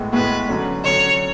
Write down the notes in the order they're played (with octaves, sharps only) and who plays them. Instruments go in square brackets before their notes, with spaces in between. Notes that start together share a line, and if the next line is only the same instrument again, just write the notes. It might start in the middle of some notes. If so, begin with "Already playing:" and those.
Already playing: [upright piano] A2 G#3 B3
[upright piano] A2 G#3 B3 [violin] B4
[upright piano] D3 F#3 C#4
[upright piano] D3 F#3 C#4 [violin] C#5